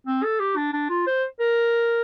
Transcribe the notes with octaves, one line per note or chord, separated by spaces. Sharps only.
C4
A4
G4
D4
D4
F4
C5
A#4